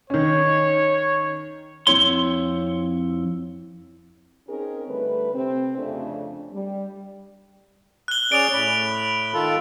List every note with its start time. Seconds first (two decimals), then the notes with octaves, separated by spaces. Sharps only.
0.10 D#3 C#4 C#5
1.87 F2 C4 E4 C#5 C6
4.48 C4 C#4 D#4 G#4 A#4
4.88 D3 G3 A3 B4
5.33 C3 C4
5.77 F2 C#3 A3 D4
6.53 G3
8.08 F#6 G7
8.32 C#4 G#4 D5 D7 F7
8.53 A2 B5
9.33 D#3 F4 A4